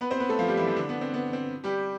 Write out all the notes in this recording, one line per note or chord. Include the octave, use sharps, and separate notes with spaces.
B3 B4
C4 C5
B3 B4
A3 A4
F3 F4
G3 G4
E3 E4
F3 F4
D3 D4
B3
C4
B3
C4
G3 G4